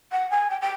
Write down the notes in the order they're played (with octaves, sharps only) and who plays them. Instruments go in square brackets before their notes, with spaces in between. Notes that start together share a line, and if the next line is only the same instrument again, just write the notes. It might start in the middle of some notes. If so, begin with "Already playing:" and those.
[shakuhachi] F#5
G#5
G5
G5